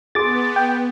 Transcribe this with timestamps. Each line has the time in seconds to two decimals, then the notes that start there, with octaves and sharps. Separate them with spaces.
0.15 B3 G#4 C6 D6 A6
0.56 G5